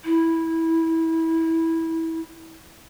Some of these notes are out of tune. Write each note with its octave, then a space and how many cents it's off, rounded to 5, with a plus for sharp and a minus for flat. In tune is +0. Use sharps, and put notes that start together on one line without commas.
E4 -15